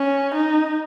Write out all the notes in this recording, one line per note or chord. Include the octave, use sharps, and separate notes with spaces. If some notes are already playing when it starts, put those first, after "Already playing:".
Already playing: C#4
D#4